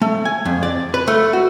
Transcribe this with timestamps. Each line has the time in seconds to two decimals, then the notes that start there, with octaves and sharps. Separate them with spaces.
0.02 A3
0.25 G#5
0.45 F2
0.63 D5
0.94 B4
1.08 A3
1.33 F#4